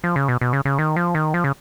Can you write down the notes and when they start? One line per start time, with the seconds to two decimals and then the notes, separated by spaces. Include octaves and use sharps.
0.04 F3
0.16 C#3
0.28 B2
0.41 B2
0.53 C#3
0.65 C#3
0.79 D#3
0.96 F3
1.15 D#3
1.34 F3
1.44 C#3